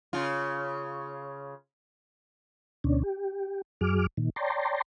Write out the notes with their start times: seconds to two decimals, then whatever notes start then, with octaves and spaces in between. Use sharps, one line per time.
0.13 C#3 F4
2.84 D2 B2 C#4 D4
3.03 G4
3.81 F#2 F#3 G#4 D6 F6
4.17 A#2 D#3
4.36 C#5 D5 G5 A5 A#5 C6